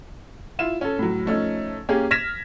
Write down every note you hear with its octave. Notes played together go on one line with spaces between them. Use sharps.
E4 F4 E7
C#4 A4
A2 F#3
F3 A3 C#4 D#4
A#3 C#4 G4 G#4
F6 G#6 A#6 B6 E7